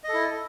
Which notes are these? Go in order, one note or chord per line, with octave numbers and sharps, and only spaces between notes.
E4 A4 D#5